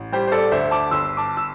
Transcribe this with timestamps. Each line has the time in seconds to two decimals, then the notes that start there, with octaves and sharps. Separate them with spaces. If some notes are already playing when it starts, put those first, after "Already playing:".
Already playing: A1
0.12 G3 G4 C5
0.27 C5
0.32 A4 D5
0.51 D2 C5 E5
0.71 A5 D6
0.91 G1 C6 E6
1.17 A5 D6
1.37 E6